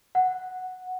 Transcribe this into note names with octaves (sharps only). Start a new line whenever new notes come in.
F#5